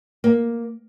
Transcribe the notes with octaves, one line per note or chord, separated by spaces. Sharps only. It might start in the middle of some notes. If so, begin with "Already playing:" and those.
A#3